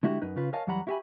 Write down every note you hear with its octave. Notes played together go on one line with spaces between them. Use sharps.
D3 G#3 E4 F#4 G4
F#2 D#4 B4
C#3 F4 B4
A#4 C#5 D#5 F5 G#5 A5
E2 F#3 G3 F#5 A#5 B5
E4 F#4 G4 E5 G#5 B5